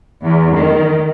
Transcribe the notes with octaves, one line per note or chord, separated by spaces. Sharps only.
E2
D#3